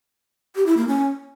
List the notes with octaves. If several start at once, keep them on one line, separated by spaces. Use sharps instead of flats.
G4
E4
A#3
C#4